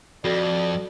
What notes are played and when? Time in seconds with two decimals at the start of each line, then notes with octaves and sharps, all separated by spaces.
0.25 F2 F#4 A4 D5